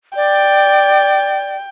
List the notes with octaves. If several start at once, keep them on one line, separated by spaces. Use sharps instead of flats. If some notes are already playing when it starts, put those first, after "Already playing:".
D5 G5